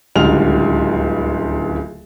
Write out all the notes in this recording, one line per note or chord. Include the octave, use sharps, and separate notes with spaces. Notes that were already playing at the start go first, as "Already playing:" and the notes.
D1 C#2 D3 G3 F6 F7